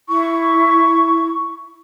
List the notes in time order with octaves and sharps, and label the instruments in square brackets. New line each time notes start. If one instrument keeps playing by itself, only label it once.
[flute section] E4 C#6